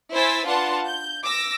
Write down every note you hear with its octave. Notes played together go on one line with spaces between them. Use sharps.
E4 C5 G#5 E6 A6 B6
D4 F4 B4 F#5 A5 C6
G6
D6 E6 A#6